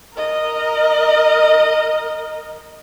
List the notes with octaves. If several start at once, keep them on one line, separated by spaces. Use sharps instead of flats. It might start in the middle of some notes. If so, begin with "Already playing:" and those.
A#4 D#5